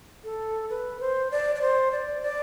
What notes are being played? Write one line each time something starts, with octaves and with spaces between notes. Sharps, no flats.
A4
B4
C5
D5
D5
C5
D5
D5